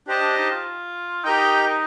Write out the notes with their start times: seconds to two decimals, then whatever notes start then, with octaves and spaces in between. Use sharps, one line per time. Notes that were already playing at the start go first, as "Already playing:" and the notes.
0.07 D4 G4 C5 D#5 A5
0.22 D4
0.37 D#4
0.51 F4
1.24 D#4 G4 A#4 D#5 G5